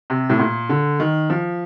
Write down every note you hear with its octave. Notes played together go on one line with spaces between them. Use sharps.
C3
A2
A#2
D3
D#3
F3